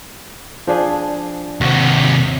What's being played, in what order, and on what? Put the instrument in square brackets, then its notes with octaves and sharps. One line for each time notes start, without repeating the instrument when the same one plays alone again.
[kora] F3 D4 G#4
[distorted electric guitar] D#2 C3 [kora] F#4